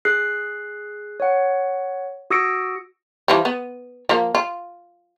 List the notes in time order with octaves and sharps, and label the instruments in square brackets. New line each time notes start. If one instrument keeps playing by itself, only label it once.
[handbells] G#4 F#6 C7
C#5 F#5
F#4 D#6 E6 A#6 C#7 D7
[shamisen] E3 F3 G3
B3
F3 A#3
F4